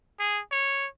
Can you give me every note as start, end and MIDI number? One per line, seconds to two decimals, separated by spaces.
0.19 0.41 68
0.52 0.87 73